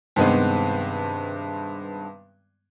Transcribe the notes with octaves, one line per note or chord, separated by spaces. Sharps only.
G2 C3 D#3 G#3 B3 C4